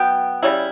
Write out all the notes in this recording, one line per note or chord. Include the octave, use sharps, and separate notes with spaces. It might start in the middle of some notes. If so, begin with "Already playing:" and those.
Already playing: F#3 B3 G5
C#3 G3 C#4 E4